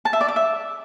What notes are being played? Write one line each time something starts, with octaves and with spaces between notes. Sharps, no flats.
A5
E5
D5
D6
E5